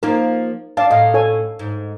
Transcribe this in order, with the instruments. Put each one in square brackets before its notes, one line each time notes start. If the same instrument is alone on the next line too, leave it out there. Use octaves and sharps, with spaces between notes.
[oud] F3 A#3 [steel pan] D#4 A#4
[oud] D4 [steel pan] D5 F5 A5
[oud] A2 [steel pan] D#5 F5
[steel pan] A4 C#5 G#5
[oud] G#2